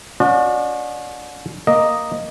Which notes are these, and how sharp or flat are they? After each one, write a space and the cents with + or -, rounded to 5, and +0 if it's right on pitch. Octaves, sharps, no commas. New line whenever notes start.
C#4 +45 F#4 -35 D5 +40
A#3 +0 D#5 +0